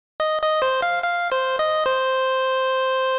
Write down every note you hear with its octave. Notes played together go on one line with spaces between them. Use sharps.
D#5
D#5
C5
F5
F5
C5
D#5
C5